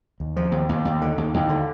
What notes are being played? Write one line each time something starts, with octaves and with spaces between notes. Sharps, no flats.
D#2
F3
D#2
D#2
D#2
D3
D#2
D#2
D3